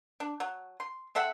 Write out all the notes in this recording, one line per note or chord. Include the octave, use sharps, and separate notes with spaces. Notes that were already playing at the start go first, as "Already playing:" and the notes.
D4
F#3
C6
C4 A4 E5 F#5